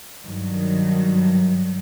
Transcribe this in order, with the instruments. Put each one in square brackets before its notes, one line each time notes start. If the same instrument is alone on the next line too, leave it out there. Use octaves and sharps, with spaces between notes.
[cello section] G2 D#3 F#3